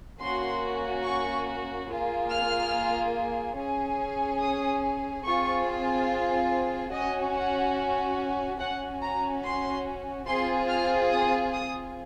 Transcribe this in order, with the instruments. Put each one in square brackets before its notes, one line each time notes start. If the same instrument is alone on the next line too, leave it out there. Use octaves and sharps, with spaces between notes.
[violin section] A#3 C#4 F#4 C6
C#6
A#3 F4 G#4
F6
C#4 G#4
D#6
C4 F4 G#4 C#6
C#4 F#4 D#5
F#5
C#4 F#4 F#5
A#5
C6
C4 F4 G#4 C6
F6
D#6
D#6